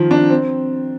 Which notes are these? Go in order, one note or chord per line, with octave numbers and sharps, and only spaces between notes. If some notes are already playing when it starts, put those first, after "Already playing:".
Already playing: D#3 F3
D4
C4